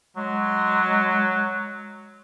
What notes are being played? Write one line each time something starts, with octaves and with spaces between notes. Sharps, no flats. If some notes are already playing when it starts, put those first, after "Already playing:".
F#3 G#3